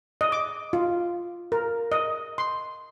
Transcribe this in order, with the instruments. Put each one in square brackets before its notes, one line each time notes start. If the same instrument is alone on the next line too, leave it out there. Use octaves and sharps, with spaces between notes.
[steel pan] D#5
D6
F4
A#4
D#5
C6